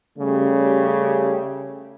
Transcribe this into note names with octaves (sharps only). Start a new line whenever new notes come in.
C#3 G3 A3 C#4 G4